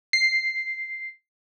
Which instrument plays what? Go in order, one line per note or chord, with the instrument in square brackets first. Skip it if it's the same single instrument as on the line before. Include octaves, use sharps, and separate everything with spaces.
[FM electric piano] C7